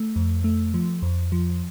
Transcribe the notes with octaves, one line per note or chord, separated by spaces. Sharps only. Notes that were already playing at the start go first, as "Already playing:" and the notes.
Already playing: A3
F2
A3
F3
F2
F3